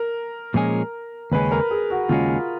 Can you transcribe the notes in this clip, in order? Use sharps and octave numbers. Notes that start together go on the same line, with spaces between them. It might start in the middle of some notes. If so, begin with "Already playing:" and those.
Already playing: A#4
A#2 F3 G#3 C#4 G#4
D#2 C#3 G#3 C#4 B4
A#4
G#4
F#4
D#2 C#3 G#3 C#4 F4